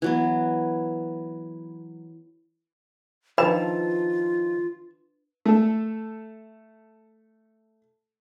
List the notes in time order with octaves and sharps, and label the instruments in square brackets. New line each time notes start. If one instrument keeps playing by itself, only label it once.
[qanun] E3 F#3 B3
[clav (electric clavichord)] D#3 F3 E4 [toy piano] D4 B4 B5 [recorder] F4 [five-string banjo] A5
[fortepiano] A3 A4